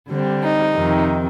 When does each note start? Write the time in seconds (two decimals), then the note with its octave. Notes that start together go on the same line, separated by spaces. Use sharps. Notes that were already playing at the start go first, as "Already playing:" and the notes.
0.09 D3 G3 C4
0.42 D#4
0.75 F2 C3 D#3